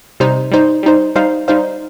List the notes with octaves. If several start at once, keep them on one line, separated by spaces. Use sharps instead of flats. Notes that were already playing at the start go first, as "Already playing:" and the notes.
C3 G3 D#4 C5
G3 D#4 C5
G3 D#4 C5
G3 D#4 C5 F5
G3 D#4 C5 F5